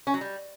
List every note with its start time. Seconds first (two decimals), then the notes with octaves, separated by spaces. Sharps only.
0.07 C#4
0.14 F#3
0.21 G3